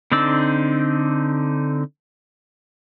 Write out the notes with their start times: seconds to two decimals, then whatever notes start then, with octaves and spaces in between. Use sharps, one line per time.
0.12 D3 C4 D#4 D5 E6